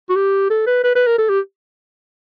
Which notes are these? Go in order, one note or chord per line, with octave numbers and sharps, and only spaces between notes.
F#4
G4
A4
B4
B4
B4
A#4
A4
G4